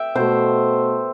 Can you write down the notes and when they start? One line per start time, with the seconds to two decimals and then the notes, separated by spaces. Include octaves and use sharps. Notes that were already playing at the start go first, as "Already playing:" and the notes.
Already playing: E5 G5
0.15 B2 A3 C5